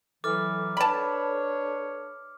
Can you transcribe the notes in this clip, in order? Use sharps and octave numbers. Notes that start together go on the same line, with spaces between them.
E3 F#3 A4 D6 F6
D4 B4 C#5 A5 B5